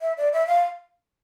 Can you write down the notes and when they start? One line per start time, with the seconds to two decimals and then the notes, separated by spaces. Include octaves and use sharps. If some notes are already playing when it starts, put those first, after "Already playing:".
0.01 E5
0.17 D5
0.33 E5
0.46 F5